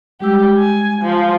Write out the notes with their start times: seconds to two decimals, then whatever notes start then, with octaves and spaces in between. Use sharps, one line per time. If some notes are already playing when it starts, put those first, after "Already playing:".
0.20 G3 G#3 G4 E6
0.58 G#5
1.01 F3 G#5